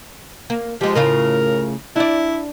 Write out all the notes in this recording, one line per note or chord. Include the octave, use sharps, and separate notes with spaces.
A#3
F3 G#3 G4
A2 C#3 F4 A#4
D4 E4 D5